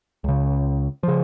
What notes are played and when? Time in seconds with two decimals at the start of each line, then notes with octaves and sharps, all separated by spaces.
0.24 C#2 C#3
1.03 C#3 F3